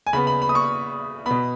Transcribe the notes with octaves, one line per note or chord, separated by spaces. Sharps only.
G#5
C#3 B3 B5
B5
B5
D#6
C#6
B2 B3 B5